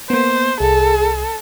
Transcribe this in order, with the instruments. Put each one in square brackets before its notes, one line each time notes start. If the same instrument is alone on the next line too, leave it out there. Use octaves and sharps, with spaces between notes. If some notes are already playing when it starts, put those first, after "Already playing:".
[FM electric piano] A#3 B3 [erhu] C5
[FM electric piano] C2 [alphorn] G#4 [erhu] A4